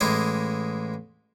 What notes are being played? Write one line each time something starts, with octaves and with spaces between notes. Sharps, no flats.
A1 G#3 E4 G4 D#5 C6